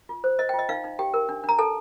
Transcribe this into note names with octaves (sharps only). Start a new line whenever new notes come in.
F4
C5
C5 D#5
G5
F4 D#5
D#4 F5
D#4
G4 G5
A#4
D4
D4 A#5
A4 A5